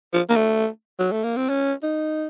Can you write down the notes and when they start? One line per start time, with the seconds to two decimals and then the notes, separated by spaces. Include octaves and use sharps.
0.13 F3
0.29 A#3
0.36 A3
0.99 F#3
1.12 A3
1.24 A#3
1.36 C4
1.49 C#4
1.83 D#4